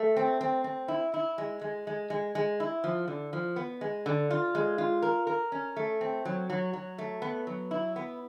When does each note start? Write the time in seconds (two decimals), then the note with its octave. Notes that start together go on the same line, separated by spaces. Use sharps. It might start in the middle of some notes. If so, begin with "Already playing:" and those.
Already playing: A3
0.16 C4
0.41 C4
0.64 C4
0.88 E4
1.14 E4
1.38 G#3
1.61 G#3
1.87 G#3
2.10 G#3
2.35 G#3
2.60 E4
2.84 F3
3.08 D3
3.33 F3
3.56 B3
3.81 G#3
4.06 D3
4.31 F4
4.55 G#3
4.78 F4
5.02 A#4
5.27 A#4
5.52 C#4
5.76 A3
6.01 C4
6.25 F#3
6.50 F#3
6.73 F#3
6.98 A3
7.22 B3
7.47 F#3
7.71 E4
7.96 B3